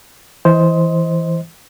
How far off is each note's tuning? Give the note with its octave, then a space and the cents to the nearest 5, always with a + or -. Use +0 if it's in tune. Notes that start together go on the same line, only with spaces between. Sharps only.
E3 +0 C5 +0 D#5 +25